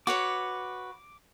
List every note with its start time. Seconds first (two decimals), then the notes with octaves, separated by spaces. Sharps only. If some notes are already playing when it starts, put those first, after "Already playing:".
0.07 F#4 B4 C#5 D6